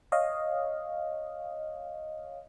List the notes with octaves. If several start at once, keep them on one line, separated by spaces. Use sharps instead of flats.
C#5 D#5 F5